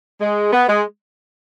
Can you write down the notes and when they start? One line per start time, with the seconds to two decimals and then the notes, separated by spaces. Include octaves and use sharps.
0.21 G#3
0.52 B3
0.68 G#3